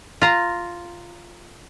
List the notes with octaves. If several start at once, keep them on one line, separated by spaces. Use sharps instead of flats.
F4 A#5